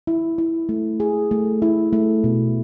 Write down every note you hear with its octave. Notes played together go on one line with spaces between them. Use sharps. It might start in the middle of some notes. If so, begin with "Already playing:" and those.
E4
E4
A3
G#4
A3
E4
A3
B2